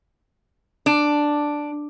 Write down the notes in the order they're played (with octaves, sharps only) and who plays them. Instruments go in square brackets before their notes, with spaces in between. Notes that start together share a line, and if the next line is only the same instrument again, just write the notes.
[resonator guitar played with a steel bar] D4